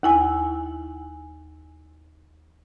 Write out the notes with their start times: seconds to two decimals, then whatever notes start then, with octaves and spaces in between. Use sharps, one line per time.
0.03 D#2 E4 G#5 E6